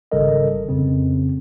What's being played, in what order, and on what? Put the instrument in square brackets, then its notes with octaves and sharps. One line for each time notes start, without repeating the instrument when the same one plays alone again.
[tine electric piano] G#1 C#3 G3 A4 A#4 D#5
F2 C#3 C4